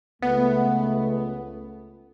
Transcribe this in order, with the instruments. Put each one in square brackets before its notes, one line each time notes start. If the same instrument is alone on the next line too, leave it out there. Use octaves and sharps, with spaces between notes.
[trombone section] C#2 A3 [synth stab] B3